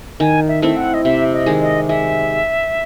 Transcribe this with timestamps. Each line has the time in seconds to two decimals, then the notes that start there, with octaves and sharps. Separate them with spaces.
0.20 D#3 G#5
0.48 E5
0.62 A3 C4 E4 E5
0.77 F#5
0.94 D#5
1.05 C3 E5
1.33 D#5
1.46 D#3 G#3
1.61 D#5
1.89 G#3 E5